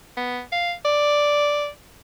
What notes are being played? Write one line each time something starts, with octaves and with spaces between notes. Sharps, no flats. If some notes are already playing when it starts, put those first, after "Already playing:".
B3
F5
D5